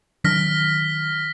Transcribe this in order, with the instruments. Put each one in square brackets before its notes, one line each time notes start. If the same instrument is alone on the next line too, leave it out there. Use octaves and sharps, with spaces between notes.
[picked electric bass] D#3 F#3 D4 [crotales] F6 A#6 B6